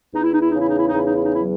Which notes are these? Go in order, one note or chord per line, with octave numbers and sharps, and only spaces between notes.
E2 D#4
E4
D#4
E4
C#3 D#4
E4
D#4
E4
D#4
E2 E4
D#4
E4
D#4
F#3 E4